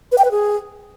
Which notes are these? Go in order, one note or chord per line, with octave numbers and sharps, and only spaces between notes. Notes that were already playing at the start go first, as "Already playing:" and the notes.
B4
G5
B4
G#4